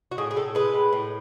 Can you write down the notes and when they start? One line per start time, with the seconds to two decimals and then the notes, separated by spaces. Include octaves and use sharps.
0.11 F#4
0.18 A2 G#4
0.31 G#4
0.36 A2 A4
0.55 G#3 B4
0.74 A2
0.93 A2